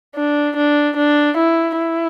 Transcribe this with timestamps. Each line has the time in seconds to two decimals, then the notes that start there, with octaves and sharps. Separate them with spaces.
0.16 D4
0.56 D4
0.97 D4
1.37 E4
1.78 E4